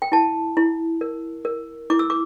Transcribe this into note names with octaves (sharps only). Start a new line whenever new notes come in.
G5
E4 A5
E4
A#4
A#4
E4 D6
E6
D6